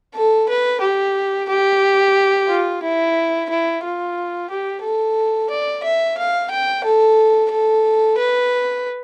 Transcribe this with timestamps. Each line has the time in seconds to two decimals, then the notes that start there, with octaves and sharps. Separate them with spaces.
0.14 A4
0.49 B4
0.81 G4
1.49 G4
2.48 F4
2.82 E4
3.49 E4
3.83 F4
4.50 G4
4.83 A4
5.50 D5
5.84 E5
6.18 F5
6.51 G5
6.84 A4
7.50 A4
8.18 B4